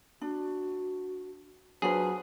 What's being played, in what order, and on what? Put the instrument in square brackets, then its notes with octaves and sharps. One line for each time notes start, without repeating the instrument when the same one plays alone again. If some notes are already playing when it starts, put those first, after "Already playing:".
[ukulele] D4 [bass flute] F#4
[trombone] F#3 [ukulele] D4 F4 B4 [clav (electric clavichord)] G#4 [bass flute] C5